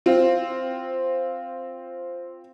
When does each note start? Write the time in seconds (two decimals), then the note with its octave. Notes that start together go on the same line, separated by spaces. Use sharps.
0.06 C4 F4